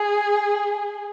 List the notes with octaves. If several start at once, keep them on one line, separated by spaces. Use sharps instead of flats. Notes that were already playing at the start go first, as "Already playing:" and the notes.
Already playing: G#4